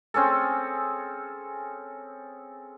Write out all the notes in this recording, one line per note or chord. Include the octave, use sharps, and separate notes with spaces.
C4 C#4 G#4 A4